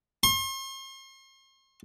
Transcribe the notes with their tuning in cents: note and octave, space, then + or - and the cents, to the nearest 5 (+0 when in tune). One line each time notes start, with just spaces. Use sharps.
C6 +40